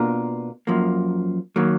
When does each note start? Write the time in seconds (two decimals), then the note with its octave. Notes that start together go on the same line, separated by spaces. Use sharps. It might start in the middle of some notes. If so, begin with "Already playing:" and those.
Already playing: B2 A#3 D4 F4 A#4
0.67 F#2 F3 A#3
1.56 D#3 F#3 A#3